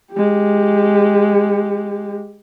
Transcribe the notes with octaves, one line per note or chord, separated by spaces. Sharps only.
G#3 G4